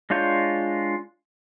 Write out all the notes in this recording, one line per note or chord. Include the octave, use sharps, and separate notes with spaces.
G#3 D4 F4 C#5 G6